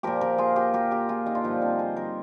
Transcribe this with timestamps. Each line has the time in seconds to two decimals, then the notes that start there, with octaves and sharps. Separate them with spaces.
0.03 A#2 F3 G4 A#4
0.21 G4 A#4
0.38 F4 G#4
0.56 G4 A#4
0.74 G4 A#4
0.91 G4 A#4
1.09 F4 G#4
1.26 D#4 G4
1.35 D4 F4
1.44 G2 D3 F3 D#4 G4
1.62 C4 D#4
1.79 G#4 C5
1.96 G4 A#4